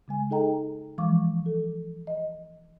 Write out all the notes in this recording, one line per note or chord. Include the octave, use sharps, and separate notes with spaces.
C#3 G#3 G#5
D#4 G#4 A4 D#5 G5 A#5
E3 F3 G#3 F5 C#6 D6
A4
D#5